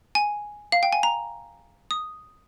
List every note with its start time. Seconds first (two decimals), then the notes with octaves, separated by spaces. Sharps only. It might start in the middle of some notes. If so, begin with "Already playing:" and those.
0.15 G#5
0.72 F5
0.83 G5
0.93 G#5
1.03 A#5
1.91 D#6